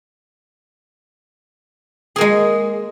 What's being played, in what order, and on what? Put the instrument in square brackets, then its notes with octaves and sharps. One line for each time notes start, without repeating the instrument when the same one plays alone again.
[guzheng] G#4
A#3
G#3